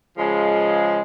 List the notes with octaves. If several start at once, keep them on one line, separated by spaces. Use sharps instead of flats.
C#3 F3 G#3